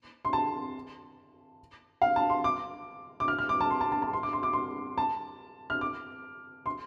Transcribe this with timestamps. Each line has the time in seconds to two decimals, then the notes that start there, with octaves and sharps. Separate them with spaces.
0.25 C6
0.33 A5
2.02 F5
2.16 A5
2.30 C6
2.44 D6
3.20 D6
3.28 F6
3.39 F6
3.49 D6
3.61 A5
3.70 C6
3.81 A5
3.92 A5
4.02 A5
4.13 C6
4.23 D6
4.33 C6
4.43 D6
4.53 C6
4.98 A5
5.70 F6
5.81 D6
6.66 C6